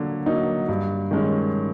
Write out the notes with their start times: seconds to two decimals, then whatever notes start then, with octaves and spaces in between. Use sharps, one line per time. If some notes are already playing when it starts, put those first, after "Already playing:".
Already playing: D3 F#3 A#3
0.26 F#3 A#3 D#4
0.69 G2
1.11 D#3 G#3 C#4